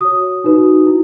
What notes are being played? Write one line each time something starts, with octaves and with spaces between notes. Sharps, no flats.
F#4 C#5 D#6
D#4 F#4 B4
E4